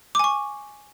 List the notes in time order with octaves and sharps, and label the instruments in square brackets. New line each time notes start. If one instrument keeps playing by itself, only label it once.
[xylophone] D6
G#5
C#6